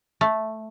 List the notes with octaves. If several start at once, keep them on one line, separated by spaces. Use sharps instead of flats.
A3